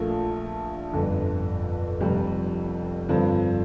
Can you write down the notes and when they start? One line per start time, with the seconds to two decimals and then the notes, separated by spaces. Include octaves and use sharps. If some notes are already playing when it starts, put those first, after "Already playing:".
Already playing: A#1 A#2 A3
0.93 G1 F2 D3
2.00 F1 F2 C3 G3
3.09 G2 D3 F3 C4